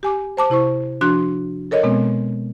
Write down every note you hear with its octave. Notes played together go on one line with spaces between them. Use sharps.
G4 G#5 D6
C5 A5 D6
C3 E4 C5 C#6
F3 D4 F#4 C6 F#6
A4 A#4 C#5 D#5
B2 G#3 B3 C4